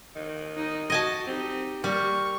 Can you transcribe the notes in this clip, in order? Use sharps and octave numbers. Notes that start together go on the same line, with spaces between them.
D#3
D#4
F#4 D#5 G#5 A5
C4 D#4 G4
G3 A#3 A#4 C#6